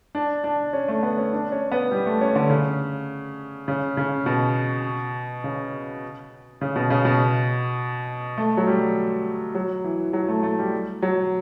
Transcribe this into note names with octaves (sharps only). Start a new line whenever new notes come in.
D4
D4
C#4
A3
B3
C#4
D4
C#4
B3
G3
A3
C#4
D3
C#3
C#3
C#3
B2
C#3
C#3
B2
C#3
B2
A3
F#3
G3
F#3
E3
F#3
A3
A3
G3
F#3